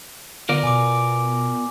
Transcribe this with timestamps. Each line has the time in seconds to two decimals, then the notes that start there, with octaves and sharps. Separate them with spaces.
0.49 D3 B3 F4 A#4 D5
0.63 B2 G#5 D6